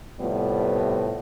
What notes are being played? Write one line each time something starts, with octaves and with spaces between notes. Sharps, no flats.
A2 C3 F3 G3 B3